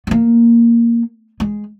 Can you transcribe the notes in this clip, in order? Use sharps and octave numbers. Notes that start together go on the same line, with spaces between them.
B3
A#3
G#3